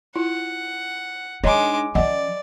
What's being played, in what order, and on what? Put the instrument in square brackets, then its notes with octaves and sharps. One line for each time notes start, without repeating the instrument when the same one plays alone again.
[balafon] E4 F4 [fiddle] F#5
[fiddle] G#3 D6 [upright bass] D4 D#4 [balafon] C#5 D#5 A#5
[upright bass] F3 C#4 [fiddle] D5 [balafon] D#5 F#5 G#5